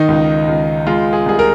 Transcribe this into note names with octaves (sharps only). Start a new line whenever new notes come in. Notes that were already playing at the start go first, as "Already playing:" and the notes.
Already playing: D#3 D#4
C#2
C#2
G#3 F4
G#4
C2 G#4
A#4